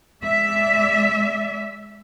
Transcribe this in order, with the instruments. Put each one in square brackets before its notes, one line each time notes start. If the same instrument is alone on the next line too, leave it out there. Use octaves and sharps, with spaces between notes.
[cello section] G#3 D5 E5